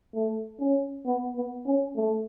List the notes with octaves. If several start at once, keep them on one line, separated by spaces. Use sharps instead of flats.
A3
C#4
B3
B3
C#4
A3